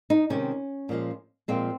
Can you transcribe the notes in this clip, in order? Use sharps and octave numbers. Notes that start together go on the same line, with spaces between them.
D#4
C3 D#3 G#3 C#4
A#2 F3 G#3
A#2 F3 G#3 C4